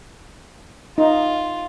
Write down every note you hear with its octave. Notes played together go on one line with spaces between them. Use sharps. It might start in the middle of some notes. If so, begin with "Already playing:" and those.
D#4 F4